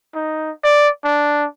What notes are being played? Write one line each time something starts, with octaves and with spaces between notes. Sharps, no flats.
D#4
D5
D4